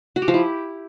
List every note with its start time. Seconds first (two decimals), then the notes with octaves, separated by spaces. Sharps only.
0.16 F#4
0.22 G4
0.28 F3
0.34 E4